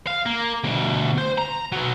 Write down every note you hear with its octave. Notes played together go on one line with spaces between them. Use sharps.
F5
A#3
D2 B2
C5
A#5
B2 F#3